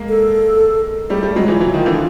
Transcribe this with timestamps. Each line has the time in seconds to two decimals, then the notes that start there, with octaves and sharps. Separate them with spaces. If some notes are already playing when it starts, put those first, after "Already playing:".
Already playing: G#3 A#3
0.09 A4
1.10 G3 A3 G#4
1.23 G3 A3
1.35 F#3 G#3 F#4
1.48 E3 F#3 F4
1.60 E3 F#3
1.74 D#3 F3
1.86 D3 E3